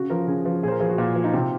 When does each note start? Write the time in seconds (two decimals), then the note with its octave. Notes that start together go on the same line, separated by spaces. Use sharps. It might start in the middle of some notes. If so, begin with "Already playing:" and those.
Already playing: C#3 F#4
0.10 F3 A#4
0.27 C#3 G#4
0.45 F3
0.63 A#2 G#4
0.68 C5
0.71 A#4
0.80 F3 G#4
0.89 F#4
0.98 A#2
1.15 F3
1.24 D#4
1.33 C3 F4